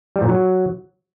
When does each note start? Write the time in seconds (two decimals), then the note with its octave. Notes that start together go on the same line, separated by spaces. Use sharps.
0.16 G3
0.22 A#2
0.29 F#3